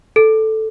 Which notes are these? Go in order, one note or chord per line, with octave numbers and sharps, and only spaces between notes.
A4